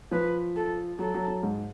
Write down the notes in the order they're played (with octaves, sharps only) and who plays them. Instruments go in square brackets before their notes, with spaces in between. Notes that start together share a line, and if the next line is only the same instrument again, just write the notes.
[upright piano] F3 [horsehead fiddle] B4
[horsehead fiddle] A4
[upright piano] F#3 [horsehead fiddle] A4
[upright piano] F#3
F#3
G#2